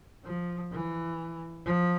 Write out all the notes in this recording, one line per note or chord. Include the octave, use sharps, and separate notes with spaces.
F3
E3
F3